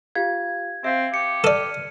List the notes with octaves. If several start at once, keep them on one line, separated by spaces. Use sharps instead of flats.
F4 G4 F5 G#6
C4 E5 F5
G4 C#7
A4 D5 F6 D#7